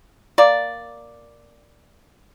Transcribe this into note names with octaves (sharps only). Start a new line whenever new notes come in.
A#3 D5